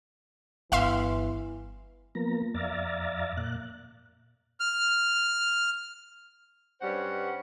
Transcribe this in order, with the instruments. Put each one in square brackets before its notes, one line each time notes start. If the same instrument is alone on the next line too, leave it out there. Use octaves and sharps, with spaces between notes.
[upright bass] G1 [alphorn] E3 [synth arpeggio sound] E5 F5 C6
[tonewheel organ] F3 A#3 B3 A#5
F2 D5 E5 F5 A#5 A6
A#2 F#6
[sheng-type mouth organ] F6
[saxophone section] G2 G3 C#4 C5 F#5